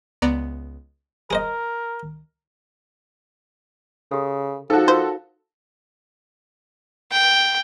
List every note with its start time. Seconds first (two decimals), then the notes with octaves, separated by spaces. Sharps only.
0.22 C#2 B3 D5 A#5
1.31 G#4 A#4 C5 D#5
4.11 C#3 G4 A4
4.70 F3 D#4 F#4 G#4 A4
4.88 F4 A#4 C5 F5
7.12 G5